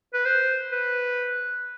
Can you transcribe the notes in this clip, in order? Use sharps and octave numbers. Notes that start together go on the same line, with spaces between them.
B4
C5
B4